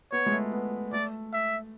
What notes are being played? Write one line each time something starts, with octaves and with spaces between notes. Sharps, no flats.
B3 C#5
G#3
A3
B3
A3 D5
E5